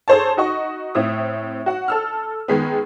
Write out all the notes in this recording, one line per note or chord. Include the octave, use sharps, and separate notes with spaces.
G#4 A4 C5 C#5 A5
D#4 F#4 D#5 C#6
A2 C4 E5 D#6
F#4 F#5
A4 E6 F6
D#3 G#3 B3